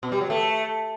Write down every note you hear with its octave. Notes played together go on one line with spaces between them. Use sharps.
B2
G3
F#3
A3